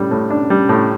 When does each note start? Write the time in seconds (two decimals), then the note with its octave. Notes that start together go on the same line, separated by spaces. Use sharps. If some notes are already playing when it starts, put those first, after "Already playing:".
Already playing: A2 G3 D4
0.11 A2
0.30 D4
0.50 G3
0.69 A2